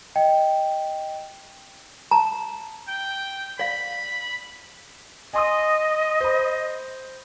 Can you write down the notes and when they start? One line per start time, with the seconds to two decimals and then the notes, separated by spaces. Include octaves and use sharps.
0.16 D#5 G5
2.11 A5 A#5
2.88 G5
3.59 D5 F5 B5
5.33 D#5 G#5 C6 D#6
6.21 C5 B5